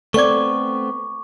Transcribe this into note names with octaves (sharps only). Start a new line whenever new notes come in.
A3 B3 C4 A4 D5 C#6 D6 G#6